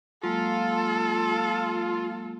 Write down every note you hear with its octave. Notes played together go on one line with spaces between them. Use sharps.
F#3 G#3 A#3 F4 A4